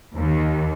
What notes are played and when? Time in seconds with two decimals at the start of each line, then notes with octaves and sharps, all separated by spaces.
0.16 D#2